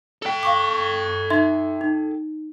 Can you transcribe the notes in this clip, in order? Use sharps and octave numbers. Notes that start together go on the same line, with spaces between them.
A4 G5
F5 C#6 D6
D#4 E5 C6
D#4